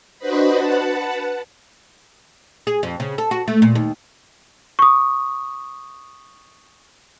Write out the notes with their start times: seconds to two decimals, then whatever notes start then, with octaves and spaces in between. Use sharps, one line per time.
0.18 D4 F#4 B4 C5 D#5 B5
0.53 B4 F#5 A5
2.67 G#4
2.83 F2
3.00 C#3
3.18 A4
3.31 F#4
3.48 A3
3.62 A#2
3.75 D#2
4.79 C#6 D#6